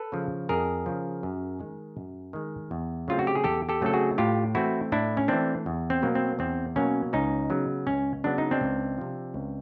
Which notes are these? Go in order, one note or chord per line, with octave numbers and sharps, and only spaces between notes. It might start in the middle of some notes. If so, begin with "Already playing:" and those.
Already playing: A4 B4
C#3 F3
F2 G#4 A#4
C#3 F3
F#2
D#3 G#3
F#2
D#3 G#3
E2
C#3 F#3 A3 C4 F4
F#4
G4
G#4
E2 G4 A4
G4 A4
C#3 F#3 A3 C4 A4
F#4 G#4
A2 F4 G4
E3 A3 C4 E4 F#4
A2 D4 E4
C#4
E3 A3 C4 D4
E2
C4
B2 F#3 A#3
C4
E2 C4
B2 F#3 A#3 C#4
C#2 C#4 D#4
C#3 F#3 B3
C#2 C#4
C#3 F#3 B3 D4
D#4
C4 D4
C#2
C3 F3
C#2